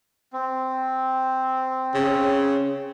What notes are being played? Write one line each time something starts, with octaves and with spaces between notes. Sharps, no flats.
C4
C#3